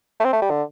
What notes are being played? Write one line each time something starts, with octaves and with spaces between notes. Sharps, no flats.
A3
C4
A3
G3
D3